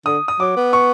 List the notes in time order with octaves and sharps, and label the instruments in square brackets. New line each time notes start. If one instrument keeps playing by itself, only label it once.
[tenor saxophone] D3 [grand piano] D#6
[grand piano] D#6
[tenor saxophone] F#3 [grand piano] D6
[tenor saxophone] B3
[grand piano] C#6